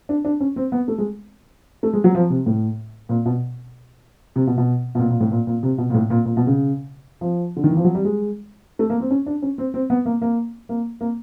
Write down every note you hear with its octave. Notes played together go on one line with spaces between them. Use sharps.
D4
D4
C#4
C4
B3
A3
G#3
A3
G#3
F#3
F3
C3
A2
A#2
B2
C3
B2
B2
B2
A#2
A#2
A2
A#2
A#2
C3
B2
A#2
A2
A#2
A#2
B2
C#3
F3
D3
D#3
E3
F3
F#3
G3
G#3
A3
A#3
C4
C#4
D4
C#4
C4
C4
B3
A#3
A#3
A#3
A#3